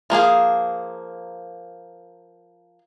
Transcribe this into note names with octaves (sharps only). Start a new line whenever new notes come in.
F3 A#3 G#4 F5